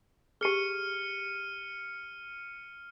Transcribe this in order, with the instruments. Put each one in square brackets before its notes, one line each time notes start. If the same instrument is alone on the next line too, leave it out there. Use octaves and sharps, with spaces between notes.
[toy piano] G4 G#4 [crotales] F6 C#7 D#7